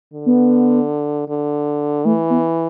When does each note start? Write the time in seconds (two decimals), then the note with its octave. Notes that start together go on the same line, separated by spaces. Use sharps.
0.14 D3
0.26 B3
1.28 D3
2.05 E3 A3
2.30 B3